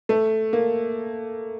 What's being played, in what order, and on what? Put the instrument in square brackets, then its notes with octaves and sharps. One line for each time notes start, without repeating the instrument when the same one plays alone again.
[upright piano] A3
A#3